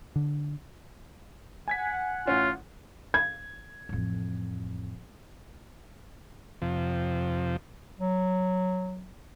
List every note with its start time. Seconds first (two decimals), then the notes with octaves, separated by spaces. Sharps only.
0.16 D3
1.68 F#5 G#5 G#6 B6
2.27 A1 C#4 F4
3.14 G#6
3.89 A1 F2
6.62 F2 C3 F3
7.99 F#3